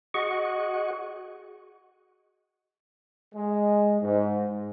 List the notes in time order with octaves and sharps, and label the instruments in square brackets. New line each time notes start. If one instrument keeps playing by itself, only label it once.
[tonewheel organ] F#4 G#4 D#5 F#5 C#6
[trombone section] G#3
G#2